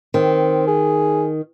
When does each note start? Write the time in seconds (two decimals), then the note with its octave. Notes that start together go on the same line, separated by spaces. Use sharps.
0.14 D#3 C4
0.67 G#4